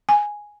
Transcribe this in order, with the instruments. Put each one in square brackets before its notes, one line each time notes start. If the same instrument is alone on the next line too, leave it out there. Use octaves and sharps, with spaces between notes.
[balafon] G#5